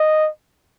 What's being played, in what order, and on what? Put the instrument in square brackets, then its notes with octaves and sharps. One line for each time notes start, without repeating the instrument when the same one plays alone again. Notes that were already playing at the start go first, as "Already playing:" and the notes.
Already playing: [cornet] D#5